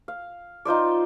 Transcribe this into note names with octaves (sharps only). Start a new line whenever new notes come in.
F5
D#4 F4 C5 D5